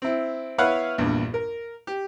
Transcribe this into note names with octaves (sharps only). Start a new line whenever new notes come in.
C4 E4
B3 E4 B4 C#5 F5 F#5
A#1 E2 G2
A#4
G4